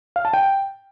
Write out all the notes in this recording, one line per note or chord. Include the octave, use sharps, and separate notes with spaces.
F5
A5
G5